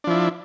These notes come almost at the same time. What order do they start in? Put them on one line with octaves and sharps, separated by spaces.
D4 F3 E4